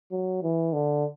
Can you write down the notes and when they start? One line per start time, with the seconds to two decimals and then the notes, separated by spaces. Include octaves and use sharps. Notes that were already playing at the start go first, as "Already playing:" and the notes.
0.11 F#3
0.42 E3
0.73 D3